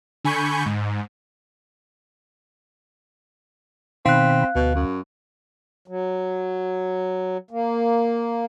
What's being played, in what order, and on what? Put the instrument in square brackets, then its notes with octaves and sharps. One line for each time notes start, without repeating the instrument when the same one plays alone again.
[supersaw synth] D3 G#5 B5 C#6 G6
G#2
[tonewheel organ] B2 D#3 B5 [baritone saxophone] C4 [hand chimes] F5 F#6
[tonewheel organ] D2 [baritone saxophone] B2
[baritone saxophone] F#2
[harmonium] F#3
A#3